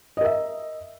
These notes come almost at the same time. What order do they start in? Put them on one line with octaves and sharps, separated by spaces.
D#5 A#4 E5